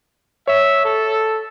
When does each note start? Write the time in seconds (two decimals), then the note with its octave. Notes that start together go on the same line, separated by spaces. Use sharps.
0.48 C#5 E5
0.85 A4